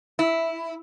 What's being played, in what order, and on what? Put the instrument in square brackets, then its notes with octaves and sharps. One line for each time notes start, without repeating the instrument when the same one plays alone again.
[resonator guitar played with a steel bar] E4